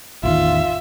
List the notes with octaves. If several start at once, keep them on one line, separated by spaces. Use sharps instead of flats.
A1 E2 D#3 F4 E5